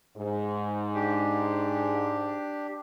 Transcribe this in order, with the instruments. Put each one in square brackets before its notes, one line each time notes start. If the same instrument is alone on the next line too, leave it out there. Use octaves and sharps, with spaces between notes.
[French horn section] G#2
[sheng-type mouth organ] D4 G4